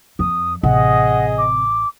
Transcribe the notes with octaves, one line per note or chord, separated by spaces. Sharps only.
F2 D#6
A1 C3 G#4 D#5 F#5
D6